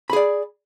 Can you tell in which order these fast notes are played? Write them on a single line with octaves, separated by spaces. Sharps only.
B5 G#4 D5